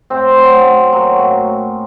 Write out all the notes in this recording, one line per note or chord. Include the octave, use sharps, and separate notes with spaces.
A2 C4 C5
F#3
C#4
F#3 A#3 F#4
A2